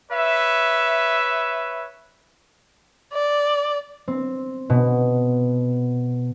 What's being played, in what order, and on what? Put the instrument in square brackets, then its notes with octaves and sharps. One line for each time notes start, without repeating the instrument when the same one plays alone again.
[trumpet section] B4 C#5 E5
[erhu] D5
[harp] C4
B2